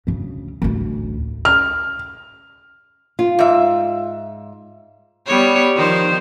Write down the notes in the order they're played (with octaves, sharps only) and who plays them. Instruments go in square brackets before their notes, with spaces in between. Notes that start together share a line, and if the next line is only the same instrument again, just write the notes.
[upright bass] D2 C#3
A1 D2
[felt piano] F6
[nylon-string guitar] F4
[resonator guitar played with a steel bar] G#2 E5
[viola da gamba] G3 B3 C#5
D#3 F3 C5